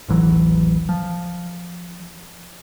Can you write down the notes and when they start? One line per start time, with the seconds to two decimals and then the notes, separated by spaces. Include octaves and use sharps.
0.08 D#1 A1 E3 F#3
0.89 F3